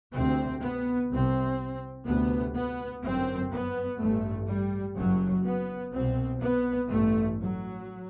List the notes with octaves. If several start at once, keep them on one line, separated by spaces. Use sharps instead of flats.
D2 C3 C4
B3
C2 C3 C4
D2 C3 B3
B3
G1 F#2 C4
B3
A1 G2 A3
G3
F#1 F#2 F#3
B3
C2 B2 C4
B3
A1 G2 A3
F#3